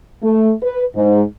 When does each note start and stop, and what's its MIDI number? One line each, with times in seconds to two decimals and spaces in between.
0.22 0.52 57
0.62 0.83 71
0.95 1.22 44